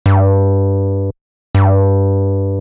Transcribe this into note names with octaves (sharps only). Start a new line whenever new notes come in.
G2
G2